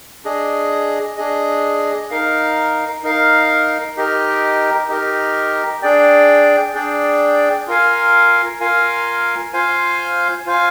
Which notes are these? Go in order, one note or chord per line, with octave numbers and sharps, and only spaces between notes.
D4 G#4 D#5
D4 G#4 D#5
D#4 A#4 F5
D#4 A#4 F5
D#4 G4 A#4 D#5
D#4 G4 A#4 D#5
D4 G#4 D5 G5
D4 G#4 D5 G5
F4 A#4 F5 G#5
F4 A#4 F5 G#5
F4 C5 F5 G#5
F4 C5 F5 G#5